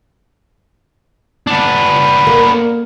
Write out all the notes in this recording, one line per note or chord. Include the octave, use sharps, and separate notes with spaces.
B3 D4
A#3